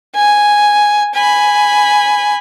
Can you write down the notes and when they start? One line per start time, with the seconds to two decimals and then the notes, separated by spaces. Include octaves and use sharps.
0.15 G#5
1.14 G#5 B5